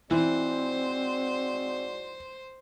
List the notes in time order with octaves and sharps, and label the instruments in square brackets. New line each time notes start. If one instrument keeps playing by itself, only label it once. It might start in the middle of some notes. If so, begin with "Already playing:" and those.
[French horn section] G#2 F#4 D5 [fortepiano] E3 [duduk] C4 [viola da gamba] C5